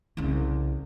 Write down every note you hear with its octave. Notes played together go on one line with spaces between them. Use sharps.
C2 C#3